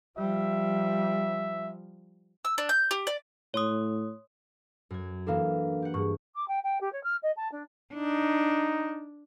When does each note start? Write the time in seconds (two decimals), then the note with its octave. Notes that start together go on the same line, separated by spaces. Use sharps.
0.18 F3 G3 E5
2.45 E6
2.58 D4
2.69 G6
2.91 G4
3.07 D5
3.54 A2 C#5 C6 D#6
4.90 F#2 G#6
5.27 E3 A#3 D4 A4 F5
5.82 G4 F#5
5.94 G2 G#4 C#6
6.35 D6
6.48 G5
6.63 G5
6.80 G4
6.92 C#5
7.03 F6
7.22 D#5
7.36 A5
7.51 D4
7.94 D4 D#4